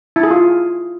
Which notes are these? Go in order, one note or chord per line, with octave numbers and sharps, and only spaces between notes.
E4
G#4
F4